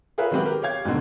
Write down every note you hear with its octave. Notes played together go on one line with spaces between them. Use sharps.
F4 G#4 A#4 B4 C#5 E5
D#3 F#3 G#3 C4 G4 B4
G4 A#4
G4 C#5 F5 G#6
F2 G#2 B2 D3 D#3